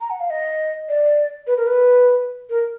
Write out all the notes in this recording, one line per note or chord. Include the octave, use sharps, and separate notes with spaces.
A#5
F#5
F5
D#5
D5
B4
A#4
B4
A#4